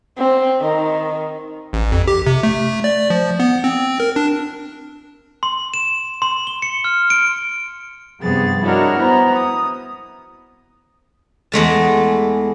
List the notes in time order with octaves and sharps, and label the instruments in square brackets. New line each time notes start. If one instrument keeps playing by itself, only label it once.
[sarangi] C4
D#3
[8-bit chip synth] A1
F2
G4
C3
A3
D5
F3
B3
C4
A#4
D4
[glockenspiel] C6
E7
C6
G7
C#7
F6
D7
[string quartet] G2 C3 F3 B3 G#4 A6
D4 E4 F#4 A#4 C#5 D#5
B3 E4 C5 A#5
D#6
[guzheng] E2 G#3 A3 A5